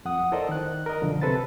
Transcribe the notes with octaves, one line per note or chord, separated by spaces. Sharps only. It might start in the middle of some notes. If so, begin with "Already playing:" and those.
F2 F#5 D#6
E4 A4 A#4 C5 D5 D#5
D#3 F#6
A#4 D#5
F#2 B2 D3 F3
C3 A4 B4 C5 A6